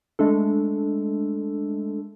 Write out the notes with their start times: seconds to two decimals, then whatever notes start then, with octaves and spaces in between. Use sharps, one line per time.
0.19 G#3 A3 D4 A4